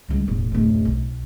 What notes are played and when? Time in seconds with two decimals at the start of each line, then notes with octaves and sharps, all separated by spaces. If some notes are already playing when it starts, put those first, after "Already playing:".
0.09 C#2 G3
0.28 E1 A1
0.52 D1 F#2
0.85 B1